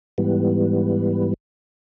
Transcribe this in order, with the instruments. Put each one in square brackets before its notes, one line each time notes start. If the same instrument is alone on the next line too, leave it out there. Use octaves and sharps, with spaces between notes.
[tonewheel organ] G#2 E3 G3 B3